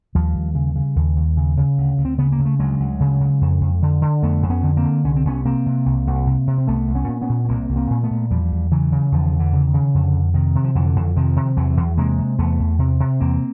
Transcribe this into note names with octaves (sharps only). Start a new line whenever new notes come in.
D#2 F3 G3
D#2
C#3
C#3
D#2
D#2
C#3
C#3
D2
D2
C4
C#3 B3
A#3
C#3
A3
D2 F#3 G#3
D2
C#3
C#3
F2
F2
D3
D3
F2 A3 B3
F2
B3 C#4
D3
A#3 C4
D3
C2 C#4
C4
C2 B3 C#4
C3 A#3 C4
C3
C2
C2
C3
C3
C4
C2 A3 B3
C2
B3 C#4
A#2
B3 C#4
A#2
C#4
C2 A#3 C4
C2
A#3 C4
A#2
A3 B3
A#2
E2 F3 G3
E2
C#3 E3 F#3
C#3
E2 D#3 F3
E2
D3 E3
C#3
D#3
C#3
F2 D3
F2
C3 D#3
C3
F3
F2 D3 E3
F2
C3 D#3 F3
C3
E2 E3 F#3
E2
C3 G#3 A#3
C3
E2 A3 B3
E2
C3
C3
E2 A#3 C4